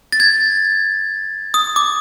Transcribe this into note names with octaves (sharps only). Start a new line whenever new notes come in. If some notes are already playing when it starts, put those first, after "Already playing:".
A6
G#6
D#6
D6